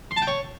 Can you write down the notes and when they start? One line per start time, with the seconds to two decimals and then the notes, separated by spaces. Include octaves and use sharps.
0.11 C6
0.16 A5
0.22 G5
0.27 C#5